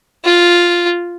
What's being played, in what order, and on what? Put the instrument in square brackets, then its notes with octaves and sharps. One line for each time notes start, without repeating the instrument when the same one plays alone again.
[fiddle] F4